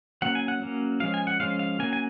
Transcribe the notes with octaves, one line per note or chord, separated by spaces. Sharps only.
F#3 A#3 C#4 F#5
G#5
F#5
F#3 A#3 C#4
F3 G#3 C#4 F5
G#5
F#5
F3 G#3 C#4 F5
F5
F#3 A#3 C#4 G#5
G#5